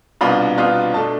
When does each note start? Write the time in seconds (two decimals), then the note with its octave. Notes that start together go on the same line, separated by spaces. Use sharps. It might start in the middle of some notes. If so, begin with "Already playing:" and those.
0.21 C2 B2 B3 D4 F4 B5
0.58 C2 B2 B3 D4 F4
0.94 B2 A3 D4 A5